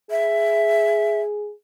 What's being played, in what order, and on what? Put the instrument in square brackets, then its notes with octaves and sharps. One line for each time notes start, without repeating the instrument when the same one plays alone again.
[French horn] G#4 [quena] E5